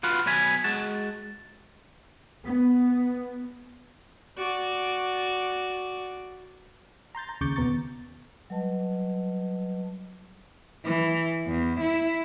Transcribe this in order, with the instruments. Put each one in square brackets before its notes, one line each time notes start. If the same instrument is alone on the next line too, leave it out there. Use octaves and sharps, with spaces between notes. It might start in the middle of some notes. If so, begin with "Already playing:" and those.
[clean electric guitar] F4 F#4 B4 F5 F#5
B2 F#3 B3 G#5 B5
G#3 F#4 A5
[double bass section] B3
[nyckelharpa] F#4 D5
[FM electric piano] A#5 C6 G6 A6
A#5
D#2 C#3 C#6 D6 G6 A6
D#2 B2 B3 A#5 C#6 A6
[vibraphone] F#3 G3 B4 D#5 A5
[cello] E3
E2
E4